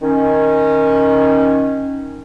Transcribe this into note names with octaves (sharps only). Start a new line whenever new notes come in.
D#3 C#4